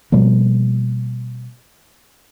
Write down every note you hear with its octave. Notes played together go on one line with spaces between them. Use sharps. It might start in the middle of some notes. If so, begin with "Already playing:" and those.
B2 F3 G3 A#3